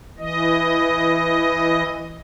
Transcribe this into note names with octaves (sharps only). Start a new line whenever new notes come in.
E3 D#5